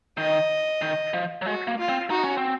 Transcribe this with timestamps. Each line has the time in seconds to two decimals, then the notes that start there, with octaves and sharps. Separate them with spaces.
0.17 D#3 D#5
0.82 D#3
1.14 F3
1.42 F#3
1.46 G#3 F#4
1.67 A#3
1.79 F4
1.89 C4
2.10 D#4 F#4
2.24 C#4
2.38 C4